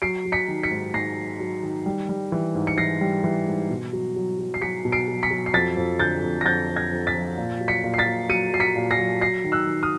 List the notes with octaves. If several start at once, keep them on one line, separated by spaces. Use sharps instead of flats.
F#3 C7 D7
F#3
B6 C#7
D#3
B6 C#7
G#2
G#2 A#6 C7
F#3
F#3
D#3
G3
G3
E3
G#2
C#7
E3 A#6 C7
G3
E3
G#2
B2
F#3
F#3
F#3
C7
F#3 B6 C#7
B2
C7 D7
F#3
B6 C#7
F#3
C7
F2 A6 B6
F2
D3 G6 A6
F2
A#6
F2 G6 A6
F2
G#6 A#6
F2
A6 B6
F3
A#2
F#3
B6 C#7
A#2
C7
A6 B6
A#2
F#3 C#7 D#7
F#3 C7
B6 C#7
A#2
A#6 C7
F#3
F#3 A#6 C7
D#3
E6 F#6
D#3
D#6 F6